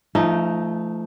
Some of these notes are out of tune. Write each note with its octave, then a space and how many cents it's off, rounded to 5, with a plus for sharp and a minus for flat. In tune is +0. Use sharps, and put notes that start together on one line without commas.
F3 -30 A3 +0 D#4 +0